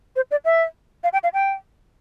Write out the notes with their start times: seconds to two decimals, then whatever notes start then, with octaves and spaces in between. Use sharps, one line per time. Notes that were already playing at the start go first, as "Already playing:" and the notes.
0.16 C5
0.31 D5
0.45 E5
1.04 F5
1.13 G5
1.23 F5
1.34 G5